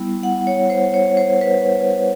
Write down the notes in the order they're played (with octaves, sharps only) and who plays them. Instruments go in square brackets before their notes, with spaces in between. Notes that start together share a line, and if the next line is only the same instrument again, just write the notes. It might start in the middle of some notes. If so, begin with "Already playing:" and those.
Already playing: [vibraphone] G3 B3 E4
F#5
C#5
C5
C#5
C5
B4